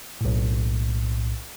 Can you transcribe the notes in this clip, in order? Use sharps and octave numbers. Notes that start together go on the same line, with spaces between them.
B1 A2